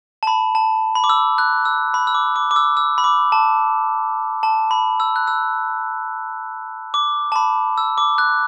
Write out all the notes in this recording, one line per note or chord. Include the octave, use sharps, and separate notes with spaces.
A5
B5
A5
B5
D6
E6
F#6
E6
B5
E6
D6
D6
D6
E6
E6
B5
D6
A5
A5
B5
E6
F#6
E6
D6
A5
B5
E6
D6
F#6